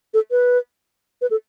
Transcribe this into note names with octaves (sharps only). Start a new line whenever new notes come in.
A4
B4
B4
A4